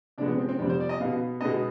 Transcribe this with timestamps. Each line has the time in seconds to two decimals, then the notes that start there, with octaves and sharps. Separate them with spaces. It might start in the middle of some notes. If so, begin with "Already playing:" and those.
0.18 C3 F3 G#3 B3 D4
0.28 B3
0.38 C4
0.49 C4
0.59 F2 C3 G3 B3 D4
0.69 C5
0.80 D5
0.89 D#5
1.00 B3 F5
1.04 B2
1.41 B2 G#3 B3 D#5